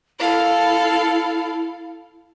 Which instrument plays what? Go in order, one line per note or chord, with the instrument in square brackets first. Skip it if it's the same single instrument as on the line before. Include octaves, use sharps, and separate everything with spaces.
[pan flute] E4 [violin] A4 F5